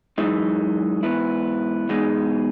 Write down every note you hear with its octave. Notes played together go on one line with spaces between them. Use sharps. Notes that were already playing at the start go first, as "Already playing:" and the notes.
F#2 E3 G#3 D#4
G#2 E3 B3 E4
E2 B2 G#3 D#4